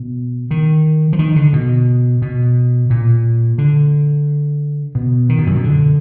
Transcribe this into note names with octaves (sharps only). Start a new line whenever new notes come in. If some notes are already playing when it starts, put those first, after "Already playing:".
Already playing: B2
D#3
F3
D#3
D3
B2
B2
A#2
D3
B2
D#3
B2
F#2
B2
D3